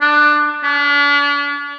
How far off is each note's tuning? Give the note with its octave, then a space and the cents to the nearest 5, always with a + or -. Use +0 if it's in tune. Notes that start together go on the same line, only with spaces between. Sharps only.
D4 +15
D4 -40